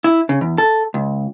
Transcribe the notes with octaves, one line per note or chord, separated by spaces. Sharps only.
E4
C#3
E2
A4
C#2